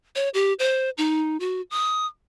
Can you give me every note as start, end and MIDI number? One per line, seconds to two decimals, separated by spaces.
0.15 0.29 73
0.34 0.53 67
0.59 0.90 72
0.98 1.37 63
1.40 1.61 66
1.71 2.06 87